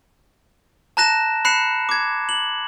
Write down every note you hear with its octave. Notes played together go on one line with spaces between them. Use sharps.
A5 A#5 F#6 A#6 E7
B5 F#6 C7 C#7 E7
D6 G#6
F#7